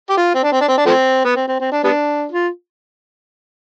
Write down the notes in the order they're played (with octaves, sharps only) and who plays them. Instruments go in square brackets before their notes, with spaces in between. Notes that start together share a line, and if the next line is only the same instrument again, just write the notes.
[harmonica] G4
F4
C4
D4
C4
D4
C4
D4
F3 A3 C4
B3
C4
C4
C4
D4
G3 B3 D4
F4